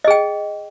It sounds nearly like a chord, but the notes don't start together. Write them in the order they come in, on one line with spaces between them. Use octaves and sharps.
D#5 G#4 G5